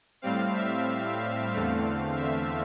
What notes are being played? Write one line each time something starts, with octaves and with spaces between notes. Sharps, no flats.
A2 G3 C4 F5
E5
E2 D3 A3 C4 F5
E5